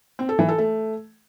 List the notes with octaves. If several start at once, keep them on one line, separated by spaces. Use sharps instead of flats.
C4
A4
E3
A4
A3